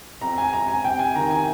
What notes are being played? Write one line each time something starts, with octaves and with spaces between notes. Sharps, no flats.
F2 A#5
G#5
F2 A#5
G#5
C3 G5
G#5
D#3 A#5
G#5